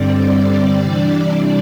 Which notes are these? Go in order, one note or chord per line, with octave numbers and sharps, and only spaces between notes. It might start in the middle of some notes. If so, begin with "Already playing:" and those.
Already playing: G2 D3 G3 C4 D5
D5
C3 E3 G3 D4